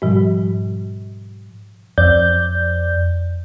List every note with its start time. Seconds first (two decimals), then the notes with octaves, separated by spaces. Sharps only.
0.02 G#2 B2 F3 G3
1.98 F2 D5 G6